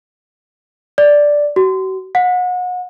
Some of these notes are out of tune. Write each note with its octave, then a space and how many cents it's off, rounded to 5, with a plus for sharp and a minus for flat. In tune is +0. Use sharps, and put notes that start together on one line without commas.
D5 +0
F#4 +40
F#5 -35